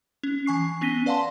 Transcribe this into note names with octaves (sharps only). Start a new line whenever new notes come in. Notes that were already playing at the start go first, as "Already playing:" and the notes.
C#4
E3 G#5 C#6 C7
B3 C#4 A#6 B6 D#7 G7
B4 D5 F5 F#5 A5 C6